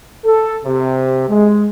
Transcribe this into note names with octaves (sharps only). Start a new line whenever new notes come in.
A4
C3
G#3